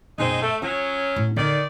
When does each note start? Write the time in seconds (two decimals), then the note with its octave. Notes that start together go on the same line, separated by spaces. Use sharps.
0.18 F#2 B2 G#3 C4 D#4
0.41 A3
0.62 F#3 C#4 F4
1.16 A2
1.36 D3 D#3 D#4 D5